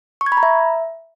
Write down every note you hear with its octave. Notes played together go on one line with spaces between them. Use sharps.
C#6
G#6
B5
A#5
E5